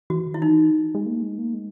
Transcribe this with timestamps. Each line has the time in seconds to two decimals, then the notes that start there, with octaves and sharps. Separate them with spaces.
0.10 E3 F#4
0.27 D#3
0.34 E4
0.41 E3 D#4
0.95 G#3
1.06 A#3
1.22 G#3
1.38 A#3
1.54 G#3